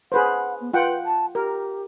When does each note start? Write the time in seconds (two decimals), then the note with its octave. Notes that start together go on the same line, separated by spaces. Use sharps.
0.12 G#4 B4 C5 F#5
0.60 B3
0.74 F4 B4 F#5 G5
1.06 A5
1.35 G4 A#4